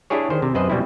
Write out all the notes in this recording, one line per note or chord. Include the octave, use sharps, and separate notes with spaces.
D4 E4 G4 G#4 C#5
D#3 C5
C3
F#2 B4 C5 D#5
B2 G3 C4 E4